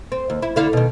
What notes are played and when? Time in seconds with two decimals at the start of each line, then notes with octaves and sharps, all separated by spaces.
0.12 C4
0.30 D#2
0.42 E4
0.56 D3 E4 F5
0.73 B2 D#3